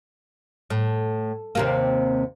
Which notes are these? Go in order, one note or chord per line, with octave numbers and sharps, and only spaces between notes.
A2
D#2 C3 A#3